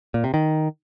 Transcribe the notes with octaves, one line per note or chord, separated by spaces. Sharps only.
A#2
C3
D#3